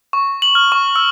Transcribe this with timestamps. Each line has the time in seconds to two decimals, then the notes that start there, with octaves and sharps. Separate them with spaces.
0.13 C#6
0.42 F#7
0.55 F6
0.72 C#6
0.96 E6